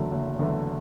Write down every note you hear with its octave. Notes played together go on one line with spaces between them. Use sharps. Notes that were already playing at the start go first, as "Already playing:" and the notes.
Already playing: F#1 E2 D3 F#3 A3
F#1
E2 D3 F#3 A3